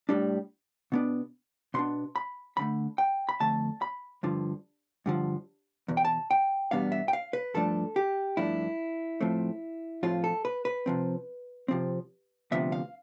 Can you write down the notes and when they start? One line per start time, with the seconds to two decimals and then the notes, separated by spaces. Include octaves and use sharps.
0.09 A2 G3 D4
0.92 B2 B3 D4
1.74 B2 B3 D4 C6
2.16 B5
2.57 F2 D3 A3 B5
2.98 G5
3.29 B5
3.40 F2 D3 A3 A5
3.82 B5
4.23 G2 D3 F3
5.06 G2 D3 F3
5.88 E2 B2
5.97 G5
6.05 A5
6.31 G5
6.71 E2 B2 G3 B3 D4 F5
6.92 E5
7.08 G5
7.13 F5
7.33 B4
7.54 G2 F3 A3 D4 A4
7.96 G4
8.37 G2 F3 A3 D4 E4
9.21 A2 F3 A3 C4
10.03 A2 F3 A3 C4 F4
10.24 A4
10.45 B4
10.65 B4
10.86 C3 F3 C4
11.68 C3 F3 C4
12.52 D2 C3 F3 B3 D4 E5
12.72 F5